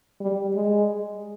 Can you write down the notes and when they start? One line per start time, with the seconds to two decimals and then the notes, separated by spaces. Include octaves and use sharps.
0.20 G3
0.55 G#3